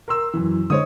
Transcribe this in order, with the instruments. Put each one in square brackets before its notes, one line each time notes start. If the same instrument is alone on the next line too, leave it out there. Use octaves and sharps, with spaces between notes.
[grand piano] A#4 C6 E6
F#2 E3
[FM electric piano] D3 G#3 C5 [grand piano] C#5 D#5 D#6